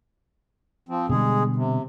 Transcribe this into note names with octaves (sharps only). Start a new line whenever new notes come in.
F3 C4
B2 D3 G3 G#3 G#4
C3